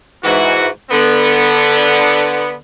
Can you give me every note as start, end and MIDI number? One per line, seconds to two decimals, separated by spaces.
0.24 0.68 44
0.24 0.68 52
0.24 0.68 66
0.91 2.54 50
0.91 2.54 59